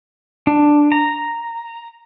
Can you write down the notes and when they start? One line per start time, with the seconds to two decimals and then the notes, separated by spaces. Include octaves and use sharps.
0.47 D4
0.92 A#5